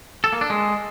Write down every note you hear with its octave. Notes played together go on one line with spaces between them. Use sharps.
A4
A#3
D4
G#3